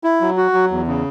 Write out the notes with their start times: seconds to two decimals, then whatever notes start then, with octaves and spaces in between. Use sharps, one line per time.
0.04 E4
0.21 F#3
0.37 F#4
0.54 F#3
0.71 E2
0.87 C#3